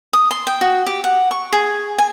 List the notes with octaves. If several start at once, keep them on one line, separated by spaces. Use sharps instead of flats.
D#6
C6
G5
F#4
G4
F#5
C#6
G#4
G#5